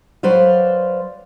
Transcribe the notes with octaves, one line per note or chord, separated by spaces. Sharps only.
F#3 B4 C5 D5 F5